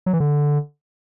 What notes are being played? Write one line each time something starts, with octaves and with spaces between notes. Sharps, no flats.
F#3
E3
D3